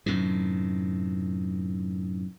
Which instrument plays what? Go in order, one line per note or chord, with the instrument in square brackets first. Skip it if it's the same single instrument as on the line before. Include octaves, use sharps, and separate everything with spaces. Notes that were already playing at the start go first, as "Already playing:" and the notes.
[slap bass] F#2 A2 C3 D#3